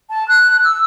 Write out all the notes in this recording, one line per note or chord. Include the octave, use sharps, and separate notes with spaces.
A5
F#6
E6